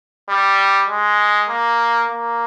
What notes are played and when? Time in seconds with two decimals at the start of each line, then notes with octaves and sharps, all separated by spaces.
0.29 G3
0.89 G#3
1.49 A#3
2.09 A#3